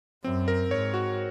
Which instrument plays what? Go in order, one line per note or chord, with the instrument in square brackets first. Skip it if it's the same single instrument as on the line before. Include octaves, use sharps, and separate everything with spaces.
[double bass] F#2 [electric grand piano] C4
[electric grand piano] A#4
[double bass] G#2 [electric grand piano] C#5
[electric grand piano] F#4